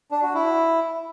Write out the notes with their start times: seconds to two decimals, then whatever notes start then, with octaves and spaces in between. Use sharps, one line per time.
0.11 D4
0.23 F#4
0.34 E4